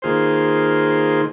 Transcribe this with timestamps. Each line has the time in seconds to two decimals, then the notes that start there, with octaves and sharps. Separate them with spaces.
0.02 D#3 A#3 F4 G#4 C5